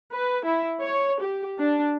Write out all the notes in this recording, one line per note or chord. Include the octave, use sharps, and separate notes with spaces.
B4
E4
C#5
G4
D4